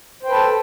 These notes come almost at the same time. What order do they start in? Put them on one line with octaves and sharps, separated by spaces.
C5 G5 B4 A5 A4